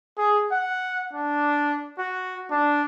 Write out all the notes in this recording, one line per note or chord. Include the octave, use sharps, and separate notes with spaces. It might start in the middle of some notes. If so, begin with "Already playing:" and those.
G#4
F#5
D4
F#4
D4